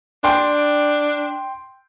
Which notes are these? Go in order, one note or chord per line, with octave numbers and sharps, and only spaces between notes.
D4 G5 C6